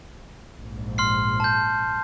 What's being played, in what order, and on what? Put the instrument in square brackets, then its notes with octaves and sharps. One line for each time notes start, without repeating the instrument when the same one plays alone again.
[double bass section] A#1 G#2
[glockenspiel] C6 F6 C7
A5 G6